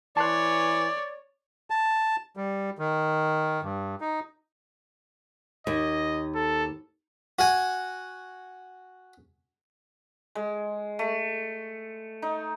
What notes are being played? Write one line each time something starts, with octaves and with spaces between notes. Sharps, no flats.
E3 C#5 D5 A5 C6 F#6
A5
G3
D#3
G2
D#4
D#2 D#5
A4
F#4 F#5 G#5
G#3
A3
D#4